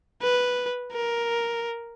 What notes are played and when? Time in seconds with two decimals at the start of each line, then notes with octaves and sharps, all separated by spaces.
0.22 B4
0.92 A#4